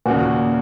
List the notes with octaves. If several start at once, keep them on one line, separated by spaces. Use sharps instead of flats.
D#2 A#2 C#3 A#3 F#4